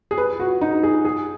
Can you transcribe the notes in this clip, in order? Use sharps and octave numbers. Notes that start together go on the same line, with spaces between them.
G#4
B4
F#4
D#4
G#4
G#4